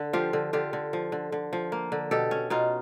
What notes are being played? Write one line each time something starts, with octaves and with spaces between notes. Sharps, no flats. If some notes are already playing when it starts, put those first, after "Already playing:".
Already playing: D3
F3 F4 G4
D3
D3 F4 G4
D3
F3
D3
D3
F3
A#3
D3
B2 G4 A4
C#4
B2 D#4 F4